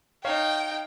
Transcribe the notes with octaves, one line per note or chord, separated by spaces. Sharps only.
D#4 C#5 F5 G5